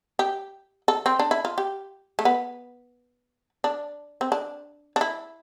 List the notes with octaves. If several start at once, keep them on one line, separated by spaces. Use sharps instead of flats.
G4
A4
C4
D4
E4
F4
G4
A3
B3
D4
C4
D4
D4
E4